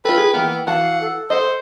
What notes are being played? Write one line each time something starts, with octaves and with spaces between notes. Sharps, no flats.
F4 A4 B4 G5
G#4
E3 A#3 B3 A#4
E3 F#4 F5 F#5 A5
A4
C5 D#5 F#5